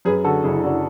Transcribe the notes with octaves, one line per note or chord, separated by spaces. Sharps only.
F#2 G#4 B4
D3 F#4 A4
F#1 E4 G#4
F#1 D4 F#4